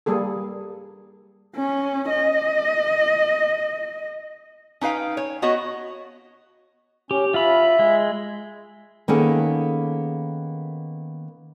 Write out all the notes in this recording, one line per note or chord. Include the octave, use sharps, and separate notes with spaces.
G3 A#3 G#4 A4
C#4
D#5
C#4 D#4 B4 F5 G5
C#5
B3 F#4 C#5 D#5
C#4 G4
F4 E5 B5
G#3
D#3 A#3 B3 C#4 G#4 A4